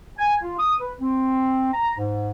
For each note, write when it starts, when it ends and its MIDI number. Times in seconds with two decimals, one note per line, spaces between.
0.19 0.36 80
0.42 0.58 65
0.59 0.75 87
0.80 0.93 71
1.00 1.71 60
1.73 1.96 82
1.98 2.31 44